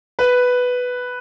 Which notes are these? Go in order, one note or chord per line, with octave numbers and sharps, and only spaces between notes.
B4